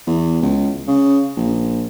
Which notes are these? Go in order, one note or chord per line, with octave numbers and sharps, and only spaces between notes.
E2
C#2
C#3
A#1